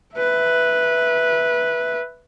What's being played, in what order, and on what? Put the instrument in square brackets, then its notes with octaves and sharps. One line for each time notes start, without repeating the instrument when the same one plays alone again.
[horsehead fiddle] B4 E5